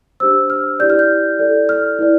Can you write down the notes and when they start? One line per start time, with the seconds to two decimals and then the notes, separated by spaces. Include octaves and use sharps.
0.20 D4 G4 C5 E6
0.50 F6
0.79 E4 G4 D5 G6
0.90 F6
0.99 G6
1.39 E4 A4 D5
1.69 F6
1.99 E4 B4 D5